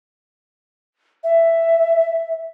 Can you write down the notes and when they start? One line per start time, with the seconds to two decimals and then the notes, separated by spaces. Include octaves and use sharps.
1.24 E5